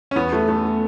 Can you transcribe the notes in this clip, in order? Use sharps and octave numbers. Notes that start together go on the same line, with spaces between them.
C#4
E2 B3
A3
A3